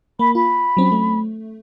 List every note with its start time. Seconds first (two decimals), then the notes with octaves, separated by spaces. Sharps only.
0.19 A#3 B5
0.35 F4 B5
0.77 F#3 C4 C#4
0.92 A3